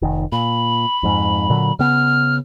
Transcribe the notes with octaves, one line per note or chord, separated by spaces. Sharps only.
F1 D#3
A#2 B5
F2 G#2
A#2 D3 F#3
C#3 B3 F6